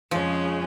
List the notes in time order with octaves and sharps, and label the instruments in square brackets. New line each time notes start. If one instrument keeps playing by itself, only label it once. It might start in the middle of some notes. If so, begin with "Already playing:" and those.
[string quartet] F2 C#3 G#3 C#4 [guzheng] F3